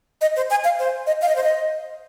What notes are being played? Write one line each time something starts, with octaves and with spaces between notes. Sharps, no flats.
D#5
C5
G#5
F5
C5
D#5
F5
D#5
C5
D#5